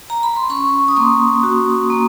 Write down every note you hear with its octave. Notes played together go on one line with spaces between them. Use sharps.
A#5
B5
C6
C#4 B5 C#6
D#6
A#3 C6 D6
F#4
A#3